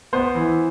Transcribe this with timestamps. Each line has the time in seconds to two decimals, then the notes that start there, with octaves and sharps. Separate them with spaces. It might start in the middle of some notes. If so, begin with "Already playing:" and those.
0.13 B3 C5
0.35 E3